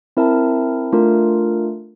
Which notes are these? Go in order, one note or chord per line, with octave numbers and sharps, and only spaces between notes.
C4 E4 A#4 E5 A5
A3 D4 F4 A#4